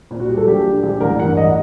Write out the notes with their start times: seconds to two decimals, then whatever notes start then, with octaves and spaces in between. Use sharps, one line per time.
0.11 A#2
0.20 F#4
0.29 G3
0.37 A4
0.47 A#1 G4
0.64 D4
0.83 A#1
1.01 A1 A#4
1.19 G2 F#5
1.37 A1 D#5